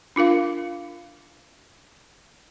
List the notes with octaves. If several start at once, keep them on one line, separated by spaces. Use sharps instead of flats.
D4 F4 A#4 F5